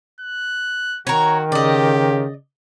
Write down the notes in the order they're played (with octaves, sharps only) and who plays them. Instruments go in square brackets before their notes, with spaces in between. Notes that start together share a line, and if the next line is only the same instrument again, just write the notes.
[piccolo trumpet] F#6
[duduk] D#3 [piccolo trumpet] F#4 [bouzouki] A#4 C#5
[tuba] C#3 [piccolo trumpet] G4 [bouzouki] D5 D#5